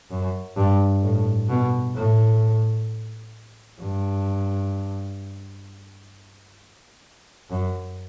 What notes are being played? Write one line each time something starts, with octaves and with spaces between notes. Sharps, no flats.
F#2
G2
A2
B2
A2
G2
F#2